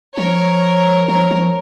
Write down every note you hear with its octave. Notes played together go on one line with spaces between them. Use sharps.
F3 A#4 C#5
F3 A#4 C#5
F3